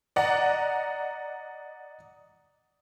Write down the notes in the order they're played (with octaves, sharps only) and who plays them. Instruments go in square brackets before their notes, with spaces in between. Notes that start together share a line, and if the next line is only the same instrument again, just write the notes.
[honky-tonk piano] D5 D#5 F#5 A#5